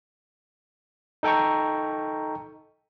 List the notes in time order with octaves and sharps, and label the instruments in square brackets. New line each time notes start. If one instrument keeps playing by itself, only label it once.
[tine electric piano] D#4 A4 G5 A#5 C#6